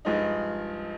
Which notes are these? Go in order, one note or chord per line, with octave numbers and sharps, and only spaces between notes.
G2 F3 G#3 D#4